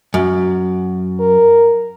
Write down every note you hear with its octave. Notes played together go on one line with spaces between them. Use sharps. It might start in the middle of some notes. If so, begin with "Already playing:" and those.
F#2
A#4